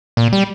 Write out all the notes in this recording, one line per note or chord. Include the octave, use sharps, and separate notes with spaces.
A#2
G3